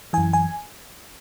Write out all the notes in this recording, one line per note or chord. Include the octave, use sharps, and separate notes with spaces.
F#2 E3 G#5
G#5